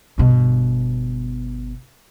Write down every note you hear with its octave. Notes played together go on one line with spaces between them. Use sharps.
G1 B2